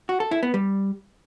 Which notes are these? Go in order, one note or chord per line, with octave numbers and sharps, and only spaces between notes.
F#4
A4
E4
B3
G3